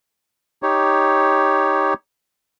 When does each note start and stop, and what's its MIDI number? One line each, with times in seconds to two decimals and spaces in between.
0.63 1.94 63
0.63 1.94 67
0.63 1.94 73